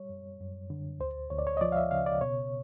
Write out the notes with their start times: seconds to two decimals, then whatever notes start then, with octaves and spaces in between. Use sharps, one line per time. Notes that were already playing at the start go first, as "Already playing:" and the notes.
Already playing: G3 C#5
0.09 F#2
0.41 F#2
0.70 D3
1.00 D2 C5
1.30 D2 C#5
1.39 D5
1.47 C#5
1.57 D#5
1.61 F3 D5
1.72 F5
1.76 E5
1.91 C#3 F5
2.06 D5
2.21 B2 C#5